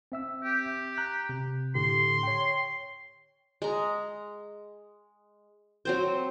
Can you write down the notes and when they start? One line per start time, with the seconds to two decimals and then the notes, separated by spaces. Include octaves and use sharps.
0.12 C4 E5 E6
0.44 G4
0.97 A#5 F#6 G6
1.29 C3
1.75 A2 D3 G4 C6
2.23 C#5 G5
3.62 G#3 A#5
5.85 F#3 C4 C5